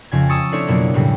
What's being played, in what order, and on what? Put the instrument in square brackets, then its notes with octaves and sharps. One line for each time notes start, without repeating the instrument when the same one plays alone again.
[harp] F2 C#3 G#5
A5 C#6 D#6 E6
A3 C4 D4 E4 C#5
F2 B2 F#3 A#3
F2 A2 C#3 G3